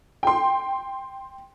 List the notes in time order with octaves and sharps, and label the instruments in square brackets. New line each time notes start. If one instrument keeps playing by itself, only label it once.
[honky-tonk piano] G5 C6